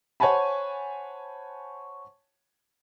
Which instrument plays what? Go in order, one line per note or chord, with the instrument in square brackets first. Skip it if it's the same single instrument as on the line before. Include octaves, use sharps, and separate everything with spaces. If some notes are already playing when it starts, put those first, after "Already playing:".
[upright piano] C5 C#5 F#5 G#5 A5 B5